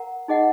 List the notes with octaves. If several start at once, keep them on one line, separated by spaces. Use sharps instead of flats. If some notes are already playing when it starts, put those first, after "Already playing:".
Already playing: A#4 F#5 A#5
D#4 G#4 D#5 F#5